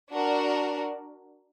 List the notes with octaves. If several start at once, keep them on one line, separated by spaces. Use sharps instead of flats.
D4 F#4 A#4 D5